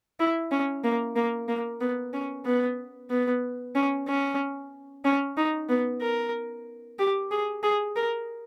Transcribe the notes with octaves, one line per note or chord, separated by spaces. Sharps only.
E4
C#4
A#3
A#3
A#3
B3
C#4
B3
B3
C#4
C#4
C#4
D#4
B3
A#4
G4
G#4
G#4
A#4